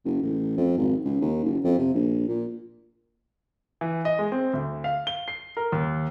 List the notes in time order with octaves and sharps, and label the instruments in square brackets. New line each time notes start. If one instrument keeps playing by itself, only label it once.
[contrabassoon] F#1
A1
F2
G#1
C#2
D#2
F#1
F2
C3
A#1
A#2
[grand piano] E3
D#5
G#3
C4
D2
F5
G7
C7
A#4
D#2